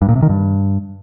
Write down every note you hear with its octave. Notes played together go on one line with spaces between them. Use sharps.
G2
A#2
C3
D#3
G2